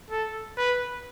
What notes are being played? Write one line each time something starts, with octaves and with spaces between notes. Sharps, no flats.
A4
B4